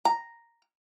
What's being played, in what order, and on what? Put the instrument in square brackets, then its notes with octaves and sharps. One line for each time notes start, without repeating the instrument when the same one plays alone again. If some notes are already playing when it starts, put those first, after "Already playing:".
[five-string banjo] A#5